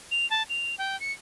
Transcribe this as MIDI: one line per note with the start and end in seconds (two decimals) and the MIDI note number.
0.11 0.29 101
0.31 0.43 81
0.50 0.75 101
0.78 0.99 79
1.00 1.12 97